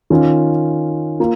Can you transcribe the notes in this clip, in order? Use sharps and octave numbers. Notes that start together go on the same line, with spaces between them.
D#3 C#4 F4
A#3 F4